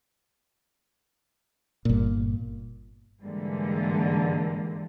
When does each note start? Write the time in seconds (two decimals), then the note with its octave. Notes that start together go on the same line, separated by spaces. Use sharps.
1.85 G1 A#2
3.23 G#2 D3 E3 G3 G#3 A#3